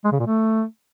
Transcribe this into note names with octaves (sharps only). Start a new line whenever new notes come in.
G#3
C#3
A#2
A3